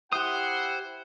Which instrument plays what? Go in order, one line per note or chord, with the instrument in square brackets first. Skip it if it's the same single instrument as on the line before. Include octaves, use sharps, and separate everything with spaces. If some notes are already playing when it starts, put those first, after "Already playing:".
[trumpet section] E4 F#5 [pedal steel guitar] G4 D#6 [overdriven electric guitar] C5